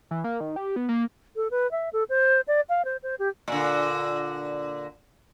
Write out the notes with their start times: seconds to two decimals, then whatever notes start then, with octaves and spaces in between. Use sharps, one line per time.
0.11 E3
0.24 A#3
0.40 D#3
0.56 G4
0.76 B3
0.89 A#3
1.36 A4
1.51 B4
1.71 E5
1.93 A4
2.09 C5
2.48 D5
2.69 F5
2.85 C5
3.03 C5
3.19 G4
3.48 A#2 D3